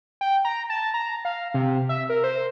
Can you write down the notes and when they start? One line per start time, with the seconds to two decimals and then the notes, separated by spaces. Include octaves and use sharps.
0.21 G5
0.45 A#5
0.70 A5
0.94 A#5
1.25 F5
1.54 C3
1.89 E5
2.09 A#4
2.24 C5